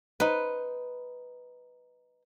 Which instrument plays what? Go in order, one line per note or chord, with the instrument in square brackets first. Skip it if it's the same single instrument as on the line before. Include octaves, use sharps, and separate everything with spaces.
[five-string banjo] D#4 C5 [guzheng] B4